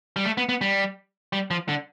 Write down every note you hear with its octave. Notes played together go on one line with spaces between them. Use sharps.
G3
A3
B3
B3
G3
G3
F3
D3